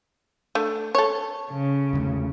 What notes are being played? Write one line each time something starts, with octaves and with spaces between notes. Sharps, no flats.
A3 D4
A4 C#5
C#3
E2 D3 A3